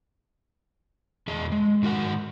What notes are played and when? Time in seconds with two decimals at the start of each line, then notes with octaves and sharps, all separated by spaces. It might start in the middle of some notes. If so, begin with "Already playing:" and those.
1.28 E2 G#4 D#5 A5
1.52 G#3
1.83 G#2 D#3 F#4 G4 A#4 F#5